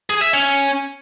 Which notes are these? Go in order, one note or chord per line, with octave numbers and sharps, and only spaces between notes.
G#4
E5
C#4